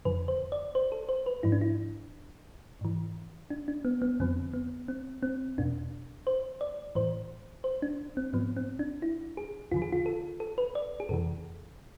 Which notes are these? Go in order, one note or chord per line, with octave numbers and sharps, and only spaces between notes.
F2 D3 F3 B4
C5
D5
C5
A4
C5
B4
G#2 F3 E4
D4
E4
G#2 E3
D4
D4
B3
B3
F2 D3 F3 C4
B3
C4
C4
E2 B2 D4
C5
D5
A2 E3 C5
C5
D4
C4
G#2 F3 B3
C4
D4
E4
G#4
E2 D3 F3 F4
G#4
F4
A4
A4
B4
D5
G#4
F2 C3 E3 A4